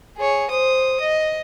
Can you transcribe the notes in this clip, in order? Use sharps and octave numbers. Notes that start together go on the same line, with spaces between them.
G#4 C#5
C5 D#6
D#5